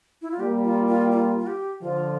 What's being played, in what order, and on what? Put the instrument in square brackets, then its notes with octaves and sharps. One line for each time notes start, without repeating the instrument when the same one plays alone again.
[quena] E4
F4
[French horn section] G3 A#3 [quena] G4
[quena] F4
F4
F4
F4
G4
[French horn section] D3 F3 [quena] F4